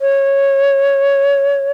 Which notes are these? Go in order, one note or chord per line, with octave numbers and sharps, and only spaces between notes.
C#5